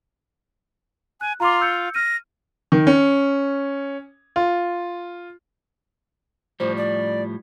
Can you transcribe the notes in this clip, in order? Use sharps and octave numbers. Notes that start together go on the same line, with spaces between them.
G#5 F#6
F4 A#5 C6 D6
E6 G6 C#7
F6 A#6 D#7
D#3
C#4
F4
A2 F3 G3 C5
D5